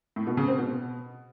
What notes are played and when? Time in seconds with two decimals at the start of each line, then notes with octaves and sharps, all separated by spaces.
0.16 A2
0.27 B2
0.37 C#3
0.48 C4
0.58 B2